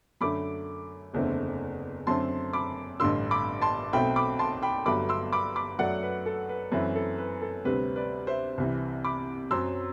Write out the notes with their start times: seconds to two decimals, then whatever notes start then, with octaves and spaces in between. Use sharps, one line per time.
0.21 F#2 D3 A3 B5 D6
1.14 F#1 E2 D3 A3 C4
2.07 F#2 D3 A3 C4 A5 C6
2.53 B5 D6
3.00 A1 G2 D3 C6 E6
3.31 B5 D6
3.62 A5 C6
3.93 B1 B2 A3 C4 G5 B5
4.16 B5 D6
4.39 A5 C6
4.62 G5 B5
4.86 G1 G2 F#3 A3 B5 D6
5.09 C6 E6
5.33 B5 D6
5.56 B5 D6
5.79 F#2 F#3 A3 D5 F#5
6.03 B4
6.26 A4
6.49 B4
6.72 F#2 E3 A3 C4 B4
6.95 A4
7.18 B4
7.42 A4
7.65 D2 C3 G3 C4 B4
7.96 B4 D5
8.27 C5 E5
8.58 C2 C3 E3
9.05 B5 D6
9.51 F#2 F#3 C4 C6 E6